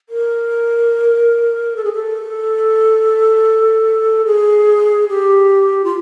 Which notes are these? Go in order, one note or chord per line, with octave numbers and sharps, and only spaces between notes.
A#4
A4
G#4
A4
G#4
G4
F4